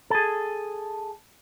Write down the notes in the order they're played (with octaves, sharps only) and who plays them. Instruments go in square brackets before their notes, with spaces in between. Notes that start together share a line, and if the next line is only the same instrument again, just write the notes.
[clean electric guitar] G#4 A4